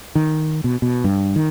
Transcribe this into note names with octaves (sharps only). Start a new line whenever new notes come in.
D#3
B2
B2
G2
D#3